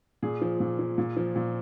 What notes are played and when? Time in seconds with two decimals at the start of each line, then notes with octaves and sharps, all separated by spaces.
0.23 A#2 G#4
0.41 F3
0.60 A#2
0.79 F3
0.98 A#2
1.17 F3
1.36 A#2